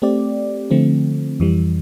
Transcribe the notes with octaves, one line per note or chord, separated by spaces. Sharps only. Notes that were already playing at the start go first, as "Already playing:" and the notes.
A3 C4 G4 D5
D3 F3 A3 C4
F2 E3 G3